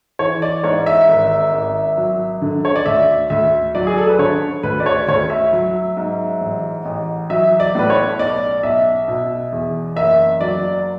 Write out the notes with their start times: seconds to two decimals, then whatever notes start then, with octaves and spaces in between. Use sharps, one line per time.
0.19 E3 C#5
0.42 D5
0.64 G#2 C#5
0.86 E5
1.09 G#1
1.53 G#1
1.97 F#3
2.42 D3
2.65 C#5
2.76 D5
2.86 D2 E5
3.30 D2 E5
3.75 F#3 D5
3.87 G#4
3.98 A4
4.09 B4
4.19 D3 C#5
4.63 D2 B4
4.80 D5
4.86 C#5
5.08 D2 C#5
5.30 E5
5.53 F#3
5.97 G#2
6.41 A1
6.85 A1
7.30 F#3 E5
7.60 D5
7.75 A2 B4
7.90 C#5
8.18 B1 D5
8.63 B1 E5
9.08 B2
9.52 E2
9.96 F#1 E5
10.41 F#3 D5